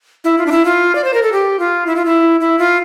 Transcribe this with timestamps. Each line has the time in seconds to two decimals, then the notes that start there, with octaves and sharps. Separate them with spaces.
0.24 E4
0.38 F4
0.46 D4
0.51 E4
0.65 F4
0.95 D5
1.04 C5
1.14 A#4
1.23 A4
1.33 G4
1.59 F4
1.86 E4
1.96 F4
2.05 E4
2.40 E4
2.59 F4